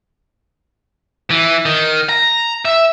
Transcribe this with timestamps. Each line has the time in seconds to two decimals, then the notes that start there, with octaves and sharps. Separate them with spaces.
1.31 E3
1.65 D#3
2.09 A#5
2.65 E5